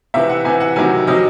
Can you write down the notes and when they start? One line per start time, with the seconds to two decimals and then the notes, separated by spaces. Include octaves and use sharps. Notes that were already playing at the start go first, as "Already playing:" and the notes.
0.14 C3 E3 E5
0.29 F#5
0.45 C3 E3 G#5
0.60 F#5
0.76 C3 D#3 F#3 G#5
1.07 C3 D#3 F#3 D#5